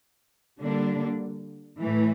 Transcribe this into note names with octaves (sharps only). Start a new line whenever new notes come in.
D3 G3 A#3 D4
A2 E3 A3